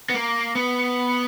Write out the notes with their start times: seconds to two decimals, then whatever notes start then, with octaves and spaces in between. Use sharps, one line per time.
0.10 B3
0.14 A#3
0.55 B3